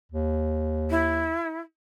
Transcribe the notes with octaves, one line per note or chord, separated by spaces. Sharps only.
D#2
E4